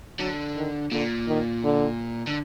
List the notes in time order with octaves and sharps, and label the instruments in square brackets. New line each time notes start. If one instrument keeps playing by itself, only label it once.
[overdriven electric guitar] D3 [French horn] F#3
[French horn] D#3
[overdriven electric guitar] A#2 [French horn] D3
[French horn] D#3
D3
[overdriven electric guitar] D3